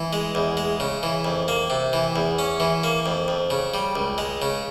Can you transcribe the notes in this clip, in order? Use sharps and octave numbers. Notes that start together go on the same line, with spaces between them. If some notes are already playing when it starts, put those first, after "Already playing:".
Already playing: E3
G#3
E2
G#3
C#3
E3
F2
A#3
C3
E3
E2
C#4
E3
A#3
F2
F2
C#3
G3
C#2
G#3
C#3